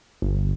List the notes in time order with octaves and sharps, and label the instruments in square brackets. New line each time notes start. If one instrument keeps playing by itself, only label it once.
[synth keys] G1